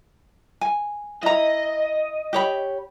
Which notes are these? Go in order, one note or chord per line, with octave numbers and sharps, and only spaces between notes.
G#5
E4 D#5 A#5
G4 C#5 B5